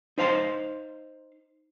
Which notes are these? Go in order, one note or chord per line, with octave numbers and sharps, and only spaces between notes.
D#4 C5 F5 B5 C6